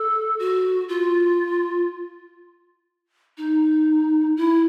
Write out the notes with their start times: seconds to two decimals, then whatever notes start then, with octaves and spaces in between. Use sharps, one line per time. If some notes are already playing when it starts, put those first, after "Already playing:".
Already playing: A4
0.39 F#4
0.89 F4
3.38 D#4
4.37 E4